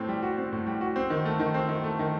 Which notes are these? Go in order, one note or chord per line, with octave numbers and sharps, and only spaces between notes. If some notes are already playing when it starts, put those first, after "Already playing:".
Already playing: A2 C4
G3
F#4
C4
A2
G3
F#4
C4
D#3
A3
D#3
C4
D#3
A3
D#3